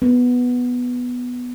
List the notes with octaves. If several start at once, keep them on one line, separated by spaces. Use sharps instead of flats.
B3